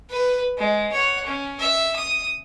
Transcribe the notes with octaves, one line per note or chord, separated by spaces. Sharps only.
B4
G#3
C#5 F#5
C#4
E5
D#6